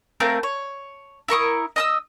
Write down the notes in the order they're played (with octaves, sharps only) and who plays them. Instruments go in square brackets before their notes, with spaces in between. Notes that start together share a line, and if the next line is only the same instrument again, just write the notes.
[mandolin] A3 C4 A#4 F5
C#5
E4 A#4 C#6 D#6
D#5 D#6 E6